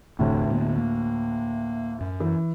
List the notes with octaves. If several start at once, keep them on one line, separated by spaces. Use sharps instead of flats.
F1 D2 A2 C3
D3 A#3 B3
A#3
F#2
E3